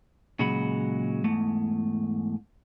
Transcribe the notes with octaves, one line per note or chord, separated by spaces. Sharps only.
A#2 C#3 F#3 G#3 F#4 B5
E2 G#2 A3